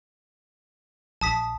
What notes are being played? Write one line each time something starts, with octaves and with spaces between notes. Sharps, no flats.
A#1 A5 D#6 B6